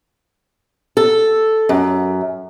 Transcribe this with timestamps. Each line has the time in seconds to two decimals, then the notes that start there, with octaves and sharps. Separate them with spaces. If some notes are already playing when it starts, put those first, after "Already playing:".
0.97 A4
1.69 F#2